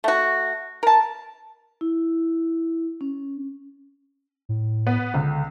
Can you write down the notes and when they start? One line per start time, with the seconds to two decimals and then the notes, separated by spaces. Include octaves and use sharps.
0.04 A3 F#4
0.83 A#4 A5
1.81 E4
3.01 C#4
4.49 A2
4.87 B3
5.14 C#2 D3